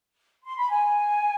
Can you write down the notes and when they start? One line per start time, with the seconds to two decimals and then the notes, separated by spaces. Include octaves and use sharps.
0.44 C6
0.57 B5
0.70 G#5